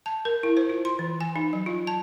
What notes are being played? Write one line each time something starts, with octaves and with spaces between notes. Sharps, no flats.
A5
A#4
E4
C5
F4
C6
E3
G#5
D#4
F#3
F4
A5